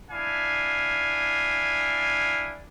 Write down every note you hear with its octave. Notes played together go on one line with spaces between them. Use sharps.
D4 E4 F5 G#5